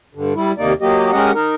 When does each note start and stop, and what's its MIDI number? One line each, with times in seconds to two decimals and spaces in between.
0.15 0.33 43
0.15 0.33 50
0.35 0.52 55
0.35 0.52 64
0.58 0.73 39
0.58 0.73 48
0.58 0.73 58
0.58 0.73 63
0.58 0.73 74
0.81 1.11 54
0.81 1.11 58
0.81 1.11 67
0.81 1.11 75
1.12 1.31 56
1.12 1.31 61
1.12 1.31 67
1.12 1.31 70
1.12 1.31 75
1.12 1.31 78
1.34 1.55 63
1.34 1.55 70